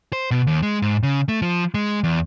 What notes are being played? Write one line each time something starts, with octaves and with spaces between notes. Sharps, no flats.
C5
B2
D#2
G#3
G#2
C#3
A3
F3
G#3
E2